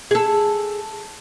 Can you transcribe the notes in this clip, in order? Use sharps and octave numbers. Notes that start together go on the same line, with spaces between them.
G#4 A4